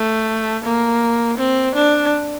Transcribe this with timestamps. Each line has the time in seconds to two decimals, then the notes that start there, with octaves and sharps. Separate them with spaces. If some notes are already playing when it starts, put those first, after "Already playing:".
Already playing: A3
0.64 A#3
1.38 C4
1.75 D4